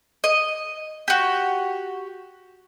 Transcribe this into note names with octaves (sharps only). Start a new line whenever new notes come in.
D#5
F#4 G4